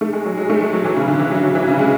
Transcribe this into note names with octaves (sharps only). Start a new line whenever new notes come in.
A3
G#3
F#3
G#3
A3
G#3
F#3
E3
C#3
D3
E3
F#3
F#3
E3
C#3
G#3